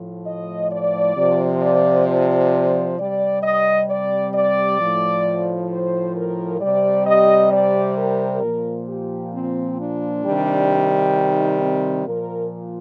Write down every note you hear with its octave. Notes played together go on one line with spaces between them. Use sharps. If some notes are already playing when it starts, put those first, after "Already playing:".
Already playing: A2 F3
D#5
D5
C3 F3
D5
D5
C3 G3 D5
D#5
D5
D5
A2 F3
C5
A#4
C3 G3 D5
D#5
D5
A#4
A#2 F3
G4
C4
D4
C3 D#3 G3
D#4
C4
A#2 F3 A#4